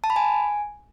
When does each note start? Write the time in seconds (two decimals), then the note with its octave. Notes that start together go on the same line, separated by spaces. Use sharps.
0.04 A5
0.10 B5
0.16 G#5